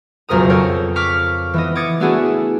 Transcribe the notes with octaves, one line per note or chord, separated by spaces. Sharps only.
F#1 B1 F2 A#4 A#5 D#6
A4 A#4 C#5 G5
C#6 D6 F6 B6 D7
E3 B3 D#5
D6 D#6 G#6 A6 C#7
A3 B3 D4 E4 F#4 G#4